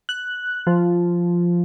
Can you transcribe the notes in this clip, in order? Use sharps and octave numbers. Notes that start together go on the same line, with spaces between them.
F#6
F3